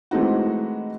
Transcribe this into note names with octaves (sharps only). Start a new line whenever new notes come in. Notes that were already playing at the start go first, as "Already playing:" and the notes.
E3 G#3 A3 C4 D#4 F#4